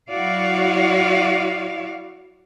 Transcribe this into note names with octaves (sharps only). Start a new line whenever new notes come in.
F#3 E4 F#4 D5 F5